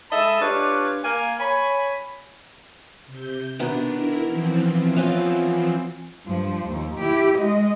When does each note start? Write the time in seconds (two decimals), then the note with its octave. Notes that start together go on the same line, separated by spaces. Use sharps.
0.12 G#3 A4 D#5 E5 A5 B5
0.41 D4 F4 G4 B4 C#5 D5
1.04 A#3 G#5
1.40 C#5 G#5 B5
3.07 C3 G6
3.59 B2 D#3 B3 D4
3.95 E4 A#4
4.27 E3 F3 C4
4.96 B3 C#4 F4
6.26 G2 F3
6.67 D#2
7.00 E4 G4
7.38 G#3 D#5